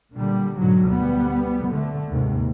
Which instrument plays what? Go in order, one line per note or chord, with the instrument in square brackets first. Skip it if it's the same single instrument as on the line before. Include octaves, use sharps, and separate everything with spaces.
[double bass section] A#2 D3 G3
G#2 B2 D3 F#3
D2 G3 B3
D3 A3
D#2 G#2 C3